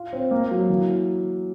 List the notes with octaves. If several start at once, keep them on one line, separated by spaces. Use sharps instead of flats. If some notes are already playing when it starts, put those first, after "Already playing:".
Already playing: F4
C4
A#3
F#3
E3